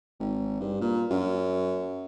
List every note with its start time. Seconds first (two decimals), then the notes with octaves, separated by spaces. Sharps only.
0.20 G#1
0.61 G2
0.81 A#2
1.11 F#2